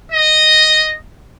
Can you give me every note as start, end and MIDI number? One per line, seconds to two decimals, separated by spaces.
0.10 0.95 75